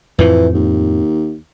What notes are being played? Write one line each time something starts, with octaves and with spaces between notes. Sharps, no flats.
F2 A2 E3 F3
D#2